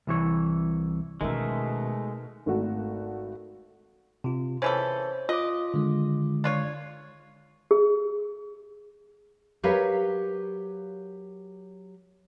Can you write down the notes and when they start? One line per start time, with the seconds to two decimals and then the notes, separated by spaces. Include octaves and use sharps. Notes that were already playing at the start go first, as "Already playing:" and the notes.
0.07 C2 E3 C#5
1.21 B2 D#3 G#3 A3 C#4 D#4 A#4 E5
2.46 G#1 A3 F#4
4.24 C3 F4
4.62 C#3 E3 A4 C5 C#5
5.29 F4 D#5 D6
5.74 D3 D#3 G#3
6.44 D4 F4 C#5
7.71 G#4
9.63 F#3 G4 A#4 B4 C#5 F5